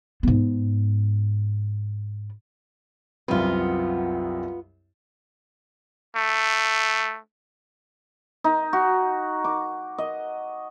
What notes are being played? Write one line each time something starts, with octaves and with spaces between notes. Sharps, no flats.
G#2 B3
C2 F#2 B3 C4 F4
A3
D#4
F#4
D6
D#5